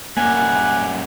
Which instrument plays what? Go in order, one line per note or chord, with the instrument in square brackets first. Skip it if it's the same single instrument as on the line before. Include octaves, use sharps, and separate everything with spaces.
[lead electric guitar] F#2 G3 [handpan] A#3 [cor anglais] F#5 [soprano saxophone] G#5